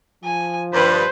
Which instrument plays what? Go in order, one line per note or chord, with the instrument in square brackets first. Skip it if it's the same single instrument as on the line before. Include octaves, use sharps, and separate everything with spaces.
[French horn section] F3 [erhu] G#5
[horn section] G2 [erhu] B4 [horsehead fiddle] C5